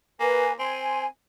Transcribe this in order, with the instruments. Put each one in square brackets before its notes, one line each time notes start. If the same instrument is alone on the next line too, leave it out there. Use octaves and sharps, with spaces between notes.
[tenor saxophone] A#3 [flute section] B4 G#5
[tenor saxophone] C4 [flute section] G#5 C6